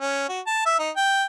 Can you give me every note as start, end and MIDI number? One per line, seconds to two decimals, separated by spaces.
0.01 0.28 61
0.29 0.40 66
0.47 0.64 81
0.66 0.77 76
0.79 0.90 63
0.97 1.24 79